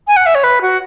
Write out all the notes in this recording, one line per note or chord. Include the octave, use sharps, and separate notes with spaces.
G#5
F#5
E5
C#5
B4
F#4